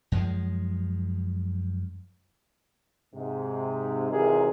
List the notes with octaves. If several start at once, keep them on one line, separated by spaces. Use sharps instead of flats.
F#2 F3 G#3
G#2 C3
G#1 C3 E3 G#4 A#4